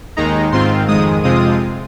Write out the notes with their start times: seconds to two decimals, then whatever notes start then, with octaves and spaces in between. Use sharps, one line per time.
0.17 D#2 D#3 G#3 D#4 A#5
0.52 G#2 D#3 C4 F4 C6
0.88 F2 D#3 G#3 D#6
1.23 F2 C3 G#3 C4 F4 D#6